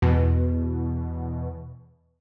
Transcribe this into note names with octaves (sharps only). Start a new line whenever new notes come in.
E2 B2